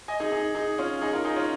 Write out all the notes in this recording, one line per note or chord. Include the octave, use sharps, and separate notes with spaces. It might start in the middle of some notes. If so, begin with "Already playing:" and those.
D#5 G#5
D#4 G#4
D#4 G#4
D#4 G#4
C#4 F4
D#4 G#4
F4 A#4
D#4 G#4
C#4 F4